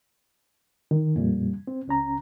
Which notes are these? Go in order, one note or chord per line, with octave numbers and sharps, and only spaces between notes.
D#3
F2 A#2 G3
C4
C#2 C#4 A#5